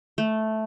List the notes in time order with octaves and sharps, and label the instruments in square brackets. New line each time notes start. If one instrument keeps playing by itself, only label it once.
[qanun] A3